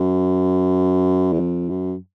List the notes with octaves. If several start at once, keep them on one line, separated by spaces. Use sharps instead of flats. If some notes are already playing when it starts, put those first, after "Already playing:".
Already playing: F#2
E2
F2
F#2